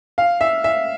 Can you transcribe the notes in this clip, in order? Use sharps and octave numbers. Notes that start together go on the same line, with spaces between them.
F5
E5
E5